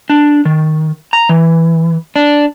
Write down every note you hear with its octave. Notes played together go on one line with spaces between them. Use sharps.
D4
D#3
A#5
E3
D4